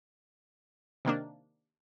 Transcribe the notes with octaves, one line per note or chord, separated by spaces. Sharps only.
C3 D#3 A#3 D4